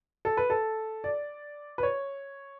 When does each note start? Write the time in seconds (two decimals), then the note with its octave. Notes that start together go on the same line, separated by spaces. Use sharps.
0.25 A4
0.37 B4
0.50 A4
1.04 D5
1.78 B4
1.83 C#5